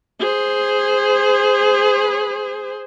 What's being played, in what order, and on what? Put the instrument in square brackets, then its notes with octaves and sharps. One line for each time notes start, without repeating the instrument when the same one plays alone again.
[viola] G#4 C5